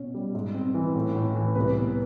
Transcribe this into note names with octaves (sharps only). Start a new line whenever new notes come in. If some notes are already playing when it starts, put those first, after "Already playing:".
Already playing: B2 C#4
G3
G#2
C4
E3
A2
A2
E3
C2 B4
B3